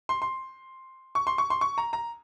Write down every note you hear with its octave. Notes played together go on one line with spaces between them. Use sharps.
C6
C6
C#6
C6
C#6
C6
C#6
A#5
A#5